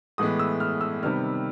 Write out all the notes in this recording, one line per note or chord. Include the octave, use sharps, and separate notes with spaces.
A2 E3 G#3 B3 D#6
E6
F6
E6
C3 D#3 G3 B3 F6